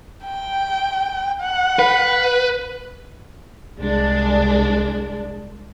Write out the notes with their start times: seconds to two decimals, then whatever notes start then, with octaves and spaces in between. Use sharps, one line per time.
0.24 G5
1.41 F#5
1.79 B4
3.77 C2 G#3 D4